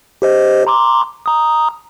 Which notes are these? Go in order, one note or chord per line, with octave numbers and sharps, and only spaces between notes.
G4 C5 D#5
A#5 C6 D6
A#5 D#6